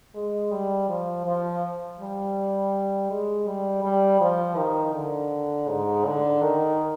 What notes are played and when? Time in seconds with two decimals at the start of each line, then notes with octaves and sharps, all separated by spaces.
0.15 G#3
0.52 G3
0.89 F3
1.26 F3
2.00 G3
3.10 G#3
3.47 G3
3.84 G3
4.21 F3
4.57 D#3
4.94 D3
5.68 G#2
6.06 D3
6.42 D#3